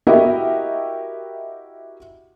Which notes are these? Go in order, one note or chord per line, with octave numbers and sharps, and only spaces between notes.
E4 F#4 G4 A#4 D#5 E5